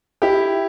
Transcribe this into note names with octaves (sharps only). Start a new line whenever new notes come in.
E4 G4